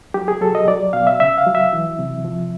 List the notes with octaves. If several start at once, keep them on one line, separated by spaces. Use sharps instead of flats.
F#3 G4
G#4
F#3 A4
D#5
F#3 D5
B2 F5
E5
C#3 E5
F5
F#3
E5
E3
C3
F3